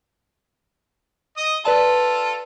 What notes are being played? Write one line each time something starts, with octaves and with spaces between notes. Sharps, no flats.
D#5 D#6
F4 A4 B4 D5 A5